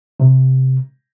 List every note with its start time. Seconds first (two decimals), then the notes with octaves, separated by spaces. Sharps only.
0.20 C3